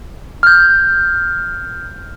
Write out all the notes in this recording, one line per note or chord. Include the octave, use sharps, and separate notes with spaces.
F6 G6